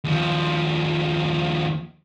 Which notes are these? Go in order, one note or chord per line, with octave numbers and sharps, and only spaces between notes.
D#2 F3